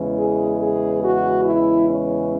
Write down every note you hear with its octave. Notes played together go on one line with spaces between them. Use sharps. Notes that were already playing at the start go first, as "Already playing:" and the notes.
Already playing: E2 C#3 E3 G#3
G#4
G#4
F#4
E4
C#4